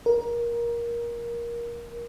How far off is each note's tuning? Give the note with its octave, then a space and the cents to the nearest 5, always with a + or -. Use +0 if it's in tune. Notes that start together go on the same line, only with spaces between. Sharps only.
A#4 +20